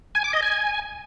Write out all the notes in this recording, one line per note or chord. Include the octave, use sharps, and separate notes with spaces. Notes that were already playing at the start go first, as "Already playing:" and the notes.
G#5
D6
D#5
G#5